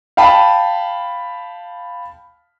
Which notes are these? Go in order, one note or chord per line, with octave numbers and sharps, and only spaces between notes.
F5 G5 A5 B5